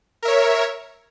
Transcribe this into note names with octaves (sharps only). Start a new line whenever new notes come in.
A#4 C#5 E5